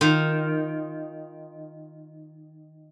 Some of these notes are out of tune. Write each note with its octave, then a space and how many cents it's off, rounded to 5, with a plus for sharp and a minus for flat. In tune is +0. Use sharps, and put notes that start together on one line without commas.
D#3 +0 F4 +0